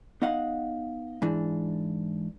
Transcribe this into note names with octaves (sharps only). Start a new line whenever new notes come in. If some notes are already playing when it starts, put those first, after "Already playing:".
B3 D#4 D#5 F5 F#5
G#2 E3 D4